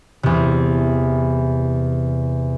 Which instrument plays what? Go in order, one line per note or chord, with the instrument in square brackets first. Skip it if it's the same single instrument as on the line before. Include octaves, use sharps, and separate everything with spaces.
[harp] E2 C3